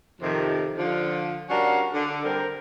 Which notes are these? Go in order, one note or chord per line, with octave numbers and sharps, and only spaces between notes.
F2 C3 D#3
D3 F3 F4
G3 C#4 D4 F#4 A#4 F5
D3
D3 G3 C4 A#4